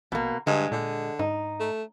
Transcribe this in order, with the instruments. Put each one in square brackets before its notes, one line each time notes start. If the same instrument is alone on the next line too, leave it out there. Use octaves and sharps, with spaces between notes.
[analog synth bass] A#1 [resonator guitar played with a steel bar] B2 A#3
[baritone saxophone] G2 [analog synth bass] D3 [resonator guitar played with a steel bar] G#3
[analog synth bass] A#2 [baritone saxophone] D3
[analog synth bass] G#2 [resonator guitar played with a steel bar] D#4
[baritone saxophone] A3